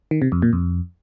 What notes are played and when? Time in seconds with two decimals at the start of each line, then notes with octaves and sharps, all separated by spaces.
0.11 D#3
0.22 C3
0.32 F2
0.42 A#2
0.53 F2